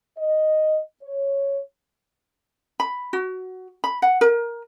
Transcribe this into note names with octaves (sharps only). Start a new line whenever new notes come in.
D#5
C#5
B5
F#4
B5
F#5
A#4